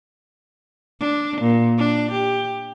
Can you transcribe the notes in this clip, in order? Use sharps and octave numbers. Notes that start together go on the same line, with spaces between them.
D4
A#2
D4
G4